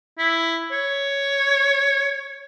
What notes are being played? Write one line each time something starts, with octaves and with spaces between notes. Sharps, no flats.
E4
C#5